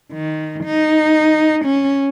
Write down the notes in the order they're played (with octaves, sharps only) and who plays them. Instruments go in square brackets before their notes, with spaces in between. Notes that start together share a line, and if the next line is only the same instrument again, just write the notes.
[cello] D#3
D#4
C#4